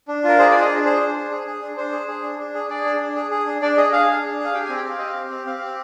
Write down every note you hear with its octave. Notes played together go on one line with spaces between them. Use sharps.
D4
F4 A#4
G#4 C5
D5
D4
D#5
D4
G#4 C5
D4
D4
G#4
G#4
D4
D4 C5
G#4
G#4
D4
D4
G#4
G#4 D5
D4
D4
G#4
G#4
D4
D4 D5
G#4 D#5
G#4 F5
D4
D4
G#4
F5
G4 G5
G#5
C4
G5
C4 F5
G4 D#5
F5
G4
C4
C4 F5
F5
G4